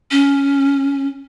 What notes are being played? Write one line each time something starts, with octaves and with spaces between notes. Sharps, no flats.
C#4